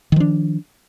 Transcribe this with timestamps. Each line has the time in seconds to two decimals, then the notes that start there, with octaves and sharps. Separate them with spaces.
0.12 D#3
0.16 F3
0.20 D4